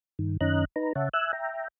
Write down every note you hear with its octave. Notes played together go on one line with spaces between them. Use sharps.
G2 D#3
F#2 D#3 C#4 D#5 A#5 F#6
D#4 B4 A#5
C#3 C#5 E5 F#5 A5
E5 G#5 E6 F#6
E5 G5 A#5